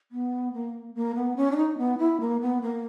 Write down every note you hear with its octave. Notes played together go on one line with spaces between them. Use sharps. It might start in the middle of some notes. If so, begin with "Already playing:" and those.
B3
A#3
A#3
B3
C#4
D4
D#4
B3
E4
A#3
B3
A#3